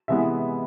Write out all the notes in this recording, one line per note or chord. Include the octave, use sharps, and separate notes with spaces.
C3 E3 G#3 B3 E5